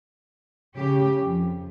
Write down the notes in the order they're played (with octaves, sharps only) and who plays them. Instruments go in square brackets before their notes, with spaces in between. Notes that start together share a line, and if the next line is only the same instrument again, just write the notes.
[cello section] C#3 G4
F2